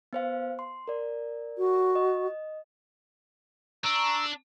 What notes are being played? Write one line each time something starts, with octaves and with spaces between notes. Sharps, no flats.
B3 C5 F5
C6
A#4 D5
F#4
D#5
D4 A#5 C#6 E6